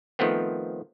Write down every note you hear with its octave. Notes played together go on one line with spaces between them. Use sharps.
D#3 F3 A3 B3 C4